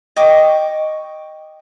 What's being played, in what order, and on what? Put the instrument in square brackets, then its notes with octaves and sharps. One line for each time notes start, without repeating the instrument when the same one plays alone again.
[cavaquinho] D#5 G5 C#6 D6